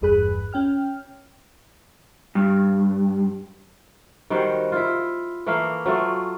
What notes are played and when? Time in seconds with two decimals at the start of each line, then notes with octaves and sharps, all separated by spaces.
0.01 G#1 E2 G2 G#4 B5 F#6
0.53 C#4 G5 F6
2.35 G2
4.30 D#3 G3 F#4 C5
4.72 E4 F4
5.46 E3 A3 A#3 F5
5.86 F#3 A3 F4